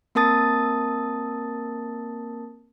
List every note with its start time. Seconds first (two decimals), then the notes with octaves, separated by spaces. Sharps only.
0.15 A#3 C4 A#4 A5 D#6 A6